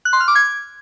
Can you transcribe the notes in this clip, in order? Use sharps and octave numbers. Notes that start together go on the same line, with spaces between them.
F#6
C6
F6
D6
G#6